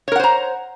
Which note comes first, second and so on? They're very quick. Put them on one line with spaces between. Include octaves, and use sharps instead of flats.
C#5 A#4 F#5 C5 A#5